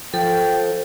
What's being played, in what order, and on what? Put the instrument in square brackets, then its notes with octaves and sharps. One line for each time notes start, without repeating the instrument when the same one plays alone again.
[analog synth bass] F3 [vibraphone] A4 [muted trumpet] G5